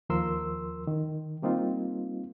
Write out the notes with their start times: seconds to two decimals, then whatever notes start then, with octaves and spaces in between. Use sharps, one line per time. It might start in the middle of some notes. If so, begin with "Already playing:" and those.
0.09 D#2 F3 A#4 C6 E6
0.87 D#3
1.42 G3 A#3 C4 D#4 F4